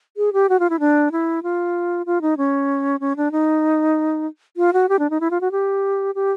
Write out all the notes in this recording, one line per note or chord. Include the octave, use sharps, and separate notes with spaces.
G#4
G4
F#4
F4
E4
D4
E4
F4
F4
D#4
C#4
C#4
D4
D#4
F4
F#4
G4
D4
D#4
E4
F4
F#4
G4
G4